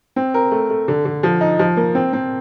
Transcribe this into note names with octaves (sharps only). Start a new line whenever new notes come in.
C4
A#4
A3
A3
D3
D3
F3
D#4
F3
A#3
C4
C4